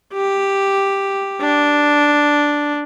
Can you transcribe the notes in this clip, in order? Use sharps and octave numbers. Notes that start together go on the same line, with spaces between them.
G4
D4